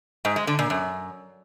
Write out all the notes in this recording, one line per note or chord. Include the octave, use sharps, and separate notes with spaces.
G#2
G#3
D3
A#2
F#2